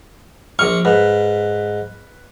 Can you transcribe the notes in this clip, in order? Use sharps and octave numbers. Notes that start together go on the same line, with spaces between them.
A#1 C#6 F6
G#2 B4